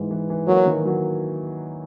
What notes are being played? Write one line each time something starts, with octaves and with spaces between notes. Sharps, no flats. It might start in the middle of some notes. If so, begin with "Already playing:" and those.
Already playing: G#2 E3
E3
E3
F#3 A#3
D#3
F#3